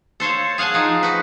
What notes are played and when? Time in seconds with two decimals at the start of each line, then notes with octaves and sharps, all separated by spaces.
0.20 A4 C5 C#5 F5
0.58 G#4 F5 F#5 G#5 A5
0.74 F3 D#4
1.03 F#4 B4